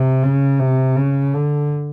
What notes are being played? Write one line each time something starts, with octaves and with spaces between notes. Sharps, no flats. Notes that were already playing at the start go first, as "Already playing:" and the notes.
Already playing: C3
C#3
C3
C#3
D3